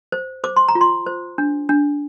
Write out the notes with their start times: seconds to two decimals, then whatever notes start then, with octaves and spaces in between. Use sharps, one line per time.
0.12 C5
0.44 C5 D6
0.56 C6
0.68 A#5
0.75 F4
0.81 C6
1.06 C5
1.38 D4
1.69 D4